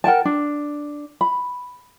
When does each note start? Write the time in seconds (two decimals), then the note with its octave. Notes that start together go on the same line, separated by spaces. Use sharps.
0.04 A#4 F#5 G5 A5
0.25 D4
1.21 B5